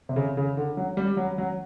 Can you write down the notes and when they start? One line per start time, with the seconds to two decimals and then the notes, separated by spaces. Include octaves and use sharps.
0.09 C3
0.16 C#3
0.37 C#3
0.57 D3
0.77 F#3
0.97 G3
1.17 F#3
1.38 F#3